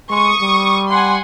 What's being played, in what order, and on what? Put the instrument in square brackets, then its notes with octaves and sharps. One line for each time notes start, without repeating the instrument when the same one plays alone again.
[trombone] G#3 [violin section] C#6 D#6
[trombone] G3
[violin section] F#5 G#5 C6